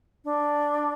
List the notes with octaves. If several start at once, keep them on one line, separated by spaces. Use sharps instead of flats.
D4